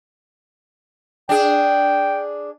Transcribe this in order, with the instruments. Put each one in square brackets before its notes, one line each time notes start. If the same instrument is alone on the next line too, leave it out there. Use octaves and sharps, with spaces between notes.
[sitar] D4 G#4 [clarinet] G5